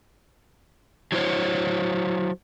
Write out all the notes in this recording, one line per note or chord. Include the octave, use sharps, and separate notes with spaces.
F#3 E4 C5 C#5